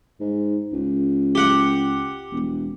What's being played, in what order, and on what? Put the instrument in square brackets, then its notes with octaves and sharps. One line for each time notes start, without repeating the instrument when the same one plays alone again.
[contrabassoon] G#2
C#2
[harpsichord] G4 F#5
[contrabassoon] E1